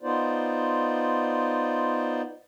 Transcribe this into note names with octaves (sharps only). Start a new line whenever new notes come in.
B3 D#4 F4 C5 D5